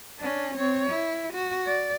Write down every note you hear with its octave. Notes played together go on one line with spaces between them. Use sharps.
C#4 D4
C4 C#5
E4
F#4
D5